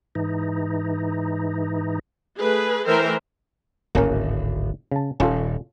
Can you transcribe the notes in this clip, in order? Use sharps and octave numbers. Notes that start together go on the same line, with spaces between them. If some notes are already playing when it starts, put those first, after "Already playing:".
G#2 E3 D#4
A3 G#4 B4
E3 A3 A#4 C5 E5 G5
D1 G#1 A#3 C#4 A#4
C#3 A5
D#1 C#4 F4 A4